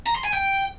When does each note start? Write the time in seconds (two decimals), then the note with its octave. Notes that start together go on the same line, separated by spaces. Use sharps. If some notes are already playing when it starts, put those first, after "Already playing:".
0.06 A#5
0.15 C6
0.24 G#5
0.33 G5